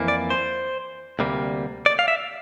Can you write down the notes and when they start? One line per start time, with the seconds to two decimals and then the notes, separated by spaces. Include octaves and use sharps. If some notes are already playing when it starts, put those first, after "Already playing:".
Already playing: F2 E3 A#3
0.08 D5
0.30 C5
1.19 D2 C3 G3 A#3
1.86 D5
1.99 F5
2.08 E5